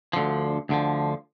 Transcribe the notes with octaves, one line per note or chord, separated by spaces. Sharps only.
D2 D3 F3
D2 D3 F3